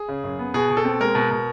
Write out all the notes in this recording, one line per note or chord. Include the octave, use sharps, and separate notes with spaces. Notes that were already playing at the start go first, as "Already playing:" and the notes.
Already playing: G#4
C#3
F#2
B3
B2 G#4
B2
A4
C4
G#3 A#4
B2
B2